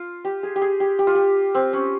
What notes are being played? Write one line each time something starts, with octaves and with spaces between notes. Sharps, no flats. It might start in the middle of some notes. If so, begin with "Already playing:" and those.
Already playing: F4
G4
G#4
G4
G#4
G4
G4
F4
G4
C4
C#4